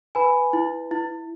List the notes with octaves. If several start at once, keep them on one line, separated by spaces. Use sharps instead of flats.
B4 G#5 B5
E4
E4